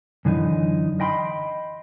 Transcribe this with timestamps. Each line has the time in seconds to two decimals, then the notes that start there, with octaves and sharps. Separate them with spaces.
0.25 F#2 D3 E3 D#4
1.00 D#5 G5 B5 C6